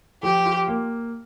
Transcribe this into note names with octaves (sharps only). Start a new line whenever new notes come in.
F3 G4
F4
A#3